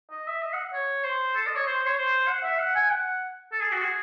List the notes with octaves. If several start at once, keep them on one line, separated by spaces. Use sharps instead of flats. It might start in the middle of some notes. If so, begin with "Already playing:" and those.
D#5
E5
D#5
F#5
C#5
C5
A4
D#5
C#5
C5
C5
C#5
C5
F#5
E5
F#5
G#5
F#5
A4
G#4
F#4
G#4